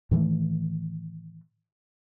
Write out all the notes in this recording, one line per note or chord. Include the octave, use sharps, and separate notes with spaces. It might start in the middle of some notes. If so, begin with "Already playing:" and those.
A2 D#3 E3 A3